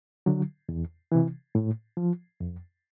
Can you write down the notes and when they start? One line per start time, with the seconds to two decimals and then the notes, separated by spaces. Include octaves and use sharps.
0.26 D3 F#3
0.69 E2
1.12 C3 E3
1.55 A2
1.97 F3
2.40 F2